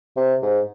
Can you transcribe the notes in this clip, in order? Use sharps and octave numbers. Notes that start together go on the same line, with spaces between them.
C3
G#2